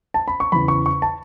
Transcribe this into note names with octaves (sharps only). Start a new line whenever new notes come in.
A5
B5
C#6
E2 C#3 E3 B5
C#6
C#6
A5